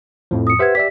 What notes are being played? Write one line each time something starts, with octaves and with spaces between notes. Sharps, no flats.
F2 A2 F3
D#6 C#7
G4 B4 C5 E5 F#5 G#6
G4 D5 E5 B6